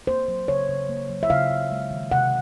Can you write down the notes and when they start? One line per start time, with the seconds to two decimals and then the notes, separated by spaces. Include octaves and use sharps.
0.07 A#3 C5
0.28 F#3
0.48 C#3 C#5
0.69 C#3
0.89 A#3
1.10 F#3
1.23 E5
1.30 C#3 F5
1.50 C#3
1.71 G#3
1.91 D#3
2.11 C3 F#5